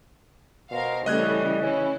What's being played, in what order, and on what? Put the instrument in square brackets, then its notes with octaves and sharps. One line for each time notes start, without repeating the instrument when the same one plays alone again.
[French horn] B2 [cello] A#4 C5 [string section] F5
[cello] C#3 E3 [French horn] G3 [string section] A3 C#4 [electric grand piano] D#5 F#6 G#6
[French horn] C#4 [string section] E4